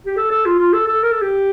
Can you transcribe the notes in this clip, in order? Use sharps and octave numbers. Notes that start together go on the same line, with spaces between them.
G4
A4
A4
F4
F4
A4
A4
A#4
A4
G4